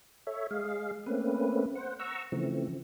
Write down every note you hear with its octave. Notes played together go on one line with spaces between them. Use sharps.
A4 C#5 E5
G#3 G#4 F5
A3 A#3 C4 C#4 B4
C5 F#5
F#5 A#5 C#6 E6
C#3 E3 F3 A3 C4